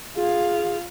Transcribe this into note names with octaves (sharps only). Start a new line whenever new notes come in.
F4 G#4 F5